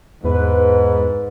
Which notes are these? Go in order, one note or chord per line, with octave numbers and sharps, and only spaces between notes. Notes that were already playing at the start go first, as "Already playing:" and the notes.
E2 G#2 B4